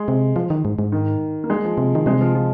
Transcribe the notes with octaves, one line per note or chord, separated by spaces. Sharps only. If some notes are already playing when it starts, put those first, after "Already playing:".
Already playing: G#3
C3
F3
D#3
G#2
G#2
D#3
A#3
G#3
F3
C3
D#3
C3 G#3
F3
F3